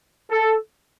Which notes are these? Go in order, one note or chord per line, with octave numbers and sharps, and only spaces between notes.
A4